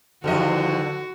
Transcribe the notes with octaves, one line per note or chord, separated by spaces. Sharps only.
E2 G2 D3 D#3 F3 F#4 D#5